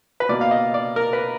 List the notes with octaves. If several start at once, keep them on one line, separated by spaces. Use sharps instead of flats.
B4
B2 A#3 D5
F5
D#5
D5
A#4
B4